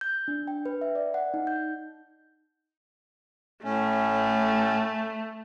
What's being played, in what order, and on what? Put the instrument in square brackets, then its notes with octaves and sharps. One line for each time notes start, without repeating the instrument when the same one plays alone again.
[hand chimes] G6
D4
G5
B4
E5
D5
F#5
D#4
G6
[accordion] A2 C#4 [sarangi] A3